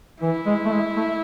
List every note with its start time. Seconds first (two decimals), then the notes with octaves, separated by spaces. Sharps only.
0.22 E3 E4
0.46 G#3
0.65 A3
0.72 G#3
0.96 A3